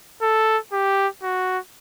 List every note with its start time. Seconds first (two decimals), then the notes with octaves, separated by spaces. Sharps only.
0.22 A4
0.72 G4
1.23 F#4